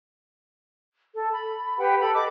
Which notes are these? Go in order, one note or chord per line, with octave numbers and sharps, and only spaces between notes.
A4
B5
G4 B4 F#5 G5
A4 B5
D#5 D6